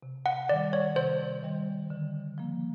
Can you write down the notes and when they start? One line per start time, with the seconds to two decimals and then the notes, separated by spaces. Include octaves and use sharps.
0.03 C3
0.26 F#5
0.49 D#3 G3 D5
0.73 C#5
0.96 C3 C5
1.43 D#3 G3
1.90 D3
2.38 F3 A#3